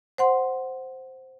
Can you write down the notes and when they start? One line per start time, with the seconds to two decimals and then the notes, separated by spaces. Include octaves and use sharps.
0.18 C5 F#5 C6